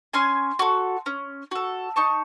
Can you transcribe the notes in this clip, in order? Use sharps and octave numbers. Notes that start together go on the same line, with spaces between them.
C#4 G#5 C6
F#4 A4
C#4
F#4 A4
D#4 A5 C#6